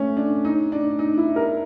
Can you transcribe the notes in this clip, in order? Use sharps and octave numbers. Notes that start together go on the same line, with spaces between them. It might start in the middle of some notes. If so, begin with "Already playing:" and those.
Already playing: A3 C#4
D4
D#4
D4
D#4
E4
A#4